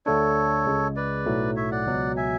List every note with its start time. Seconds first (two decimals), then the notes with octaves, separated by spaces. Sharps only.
0.06 D2 D3 A3 D4 A4 C#5
0.66 C#2 C#3 G#3
0.96 B4 D5
1.26 B1 A2 F#3 A3
1.56 C#5 E5
1.71 D5 F#5
1.87 C#2 B2 F#3
2.17 E5 G#5